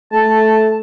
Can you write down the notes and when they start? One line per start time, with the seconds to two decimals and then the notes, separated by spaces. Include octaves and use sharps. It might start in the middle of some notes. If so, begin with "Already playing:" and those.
0.12 A3 A5